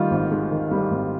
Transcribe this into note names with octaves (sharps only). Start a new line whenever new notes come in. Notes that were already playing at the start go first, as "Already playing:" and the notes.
Already playing: D#3 G3 F4
G#1
G#2
D#3
G3
G#1